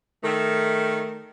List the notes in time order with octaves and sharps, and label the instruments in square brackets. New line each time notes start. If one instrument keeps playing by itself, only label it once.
[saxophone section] D#3 A3